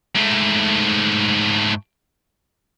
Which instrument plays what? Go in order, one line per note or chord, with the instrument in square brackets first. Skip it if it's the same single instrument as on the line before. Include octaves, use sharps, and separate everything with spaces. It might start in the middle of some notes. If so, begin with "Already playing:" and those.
[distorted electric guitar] G#2 A3